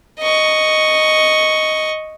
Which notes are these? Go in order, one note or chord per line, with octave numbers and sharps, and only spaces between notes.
D#5 C#6